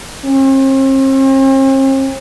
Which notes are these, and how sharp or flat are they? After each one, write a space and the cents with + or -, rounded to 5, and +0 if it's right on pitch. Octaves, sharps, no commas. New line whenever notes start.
C4 +45